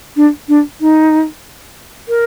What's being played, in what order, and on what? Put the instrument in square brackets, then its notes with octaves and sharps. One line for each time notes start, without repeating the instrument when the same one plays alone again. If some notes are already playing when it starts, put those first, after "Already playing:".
[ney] D4
D4
D#4
A#4